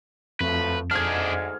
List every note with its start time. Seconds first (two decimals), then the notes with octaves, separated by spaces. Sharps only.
0.41 F2 F3 F#3 A3 B4
0.91 D2 G#2 D4 G#4 F6 G#6